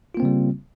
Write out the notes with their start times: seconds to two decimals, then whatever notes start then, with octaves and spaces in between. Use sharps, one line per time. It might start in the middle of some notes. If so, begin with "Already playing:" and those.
0.14 F4
0.17 A#3
0.20 C4
0.23 C#3
0.25 G3